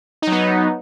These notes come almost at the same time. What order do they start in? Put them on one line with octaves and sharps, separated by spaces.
D#4 F#3 B3